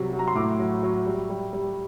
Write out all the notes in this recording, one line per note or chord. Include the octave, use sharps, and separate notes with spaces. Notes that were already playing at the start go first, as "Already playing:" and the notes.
Already playing: C3 F#3 G3
F#3
A#5
C6
A2 D6
F#3
F#3
G3
G3
G3